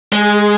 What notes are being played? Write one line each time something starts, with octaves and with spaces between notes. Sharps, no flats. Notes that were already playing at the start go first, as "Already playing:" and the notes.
G#3 G#4